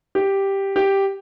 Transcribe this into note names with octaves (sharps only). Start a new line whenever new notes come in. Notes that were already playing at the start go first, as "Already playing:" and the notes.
G4
G4